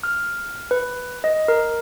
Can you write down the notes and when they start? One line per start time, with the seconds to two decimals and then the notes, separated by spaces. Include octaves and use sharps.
0.03 F6
0.71 B4
1.24 D#5
1.48 A#4